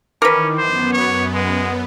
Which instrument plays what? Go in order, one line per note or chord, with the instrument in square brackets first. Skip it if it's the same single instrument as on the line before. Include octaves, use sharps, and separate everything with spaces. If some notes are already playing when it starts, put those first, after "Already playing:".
[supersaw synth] D#3 E3 [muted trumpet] C#4 [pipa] A#4 B4 [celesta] D6
[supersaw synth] F#2 B3 [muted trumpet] C5
[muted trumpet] C#5
G#3